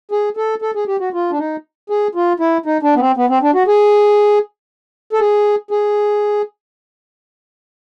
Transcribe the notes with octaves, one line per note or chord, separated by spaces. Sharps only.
G#4
A4
A4
G#4
G4
F#4
F4
D4
D#4
G#4
F4
E4
D#4
D4
B3
C4
B3
C4
D4
F#4
G#4
A4
G#4
G#4